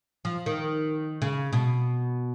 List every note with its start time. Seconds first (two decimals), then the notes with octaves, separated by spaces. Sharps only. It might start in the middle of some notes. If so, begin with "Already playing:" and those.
0.25 F3
0.46 D#3
1.22 C#3
1.53 B2